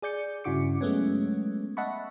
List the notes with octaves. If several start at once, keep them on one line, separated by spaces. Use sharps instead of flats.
G#4 D5 G6 C#7
G2 C#3 E4 F#4 D6 C#7
F#3 G#3 A3 B3 C#4
D#5 E5 F#5 A5 B5 C#6